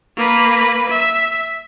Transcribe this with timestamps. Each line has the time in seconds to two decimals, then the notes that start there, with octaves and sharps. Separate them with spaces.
0.17 A#3 B4
0.90 E5